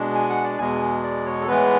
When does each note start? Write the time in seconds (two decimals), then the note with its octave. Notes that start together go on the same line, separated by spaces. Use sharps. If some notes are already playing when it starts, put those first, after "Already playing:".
Already playing: B2 G#3 D4
0.15 G#5
0.29 F#5
0.44 D5
0.58 E2 B2 G#3 G#5
1.03 D5
1.26 C#5
1.41 A4
1.48 A2 E3 G#3 B3 B4